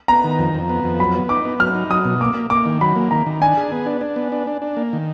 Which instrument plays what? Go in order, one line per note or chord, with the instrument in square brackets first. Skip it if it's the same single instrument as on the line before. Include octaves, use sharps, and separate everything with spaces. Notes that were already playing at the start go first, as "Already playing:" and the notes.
[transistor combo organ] B3 [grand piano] A#5
[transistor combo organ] D#3
F2
F2
B3
F2
[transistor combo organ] F#3 [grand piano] B5
[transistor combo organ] B3
[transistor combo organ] D#4 [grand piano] D6
[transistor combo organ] B3
[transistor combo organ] F#3 [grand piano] F6
[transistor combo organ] D#4
[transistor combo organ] F#3 [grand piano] D#6
[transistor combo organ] B2
[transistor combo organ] A#3 [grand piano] D6
[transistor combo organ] A#3
[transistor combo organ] A#3 [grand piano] D6
[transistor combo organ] D#3
[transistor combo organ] F#3 [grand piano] B5
[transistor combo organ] A#3
[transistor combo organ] D#3 [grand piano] A#5
[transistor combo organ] D#3
[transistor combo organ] D4 [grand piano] G#5
[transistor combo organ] G#4
B3
D4
D4
B3
D4
D4
D4
A#3
D#3